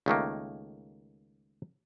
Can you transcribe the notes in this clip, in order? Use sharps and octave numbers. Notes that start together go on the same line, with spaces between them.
C#2 D#3 A3 A#3